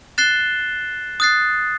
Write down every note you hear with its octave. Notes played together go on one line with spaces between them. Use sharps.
F#6 A6 C7 E7 G7
D#6 F#6 A6 C7